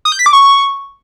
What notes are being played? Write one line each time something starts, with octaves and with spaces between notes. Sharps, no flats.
D#6
G6
B6
D6
C#6